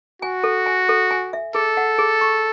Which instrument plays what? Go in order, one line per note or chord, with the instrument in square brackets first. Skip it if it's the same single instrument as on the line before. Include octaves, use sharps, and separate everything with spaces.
[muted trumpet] F#4 [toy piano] G#5
[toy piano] A4
G#5
A4
G#5
E5
[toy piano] G#4 [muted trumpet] A4
[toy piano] F#5
G#4
C#6